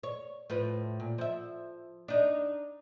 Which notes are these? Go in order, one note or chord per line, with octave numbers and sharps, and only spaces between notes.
C#5
A2 F3 B4
A#2
F3 E5
D4 D#4